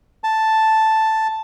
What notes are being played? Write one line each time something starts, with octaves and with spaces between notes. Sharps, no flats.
A5